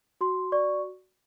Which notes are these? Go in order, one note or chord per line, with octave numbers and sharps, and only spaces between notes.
F#4 C6
D5 C#6